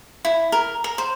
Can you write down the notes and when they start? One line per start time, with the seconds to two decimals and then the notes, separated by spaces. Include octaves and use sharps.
0.25 E4
0.52 A#4
0.84 A#4
0.98 C5